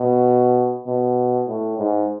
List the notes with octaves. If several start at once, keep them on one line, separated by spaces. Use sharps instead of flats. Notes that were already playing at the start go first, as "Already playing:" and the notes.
Already playing: B2
B2
A2
G#2